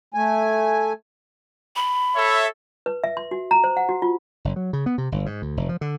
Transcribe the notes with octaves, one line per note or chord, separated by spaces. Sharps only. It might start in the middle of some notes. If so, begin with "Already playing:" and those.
A3 G#5
B5
A4 C#5 E5
B4
E5
C6
F#4
A#5
C5
F#5
F#4
F4
F#1
F#3
C#3
B3
C3
G1
G#2
D2
F1
F3
D3